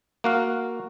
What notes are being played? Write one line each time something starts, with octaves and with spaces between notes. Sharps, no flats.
A#3 F#4 F5